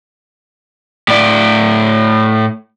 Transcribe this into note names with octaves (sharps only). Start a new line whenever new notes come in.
A2 D5